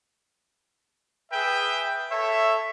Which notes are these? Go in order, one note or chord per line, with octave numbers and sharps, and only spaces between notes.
G#4 B4 E5 G5
A4 C#5 E5